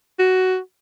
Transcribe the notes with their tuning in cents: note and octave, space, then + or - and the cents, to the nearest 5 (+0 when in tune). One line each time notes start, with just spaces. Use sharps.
F#4 +10